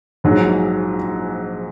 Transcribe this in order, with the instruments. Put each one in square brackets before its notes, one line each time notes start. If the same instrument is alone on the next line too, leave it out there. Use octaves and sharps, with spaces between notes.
[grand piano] A#1 G#2 F#3